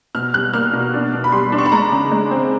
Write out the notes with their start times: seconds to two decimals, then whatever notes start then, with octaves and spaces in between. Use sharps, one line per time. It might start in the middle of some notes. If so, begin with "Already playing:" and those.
0.15 B2 F6
0.34 G3 F#6
0.54 A#3 F6
0.73 B2
0.94 D4
1.13 B2
1.24 B5
1.32 G3 C6
1.52 D4
1.58 C#6
1.66 B5
1.72 G#3 A#5
1.92 C#3
2.11 G#3
2.31 C4